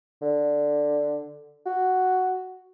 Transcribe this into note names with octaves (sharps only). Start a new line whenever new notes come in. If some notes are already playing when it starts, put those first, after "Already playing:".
D3
F#4